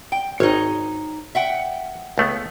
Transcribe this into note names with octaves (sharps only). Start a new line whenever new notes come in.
G5
G#1 D#4 C#5
E5 F#5 G5
C#2 A3 B3